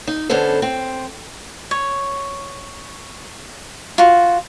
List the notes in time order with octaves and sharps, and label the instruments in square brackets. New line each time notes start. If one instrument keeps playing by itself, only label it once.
[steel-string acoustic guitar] D#4
D3 B3 C#4 A4 C5
C4
[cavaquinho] C#5
F4 F#4